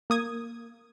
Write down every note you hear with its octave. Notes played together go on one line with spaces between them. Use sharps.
A#3 D#6 G#6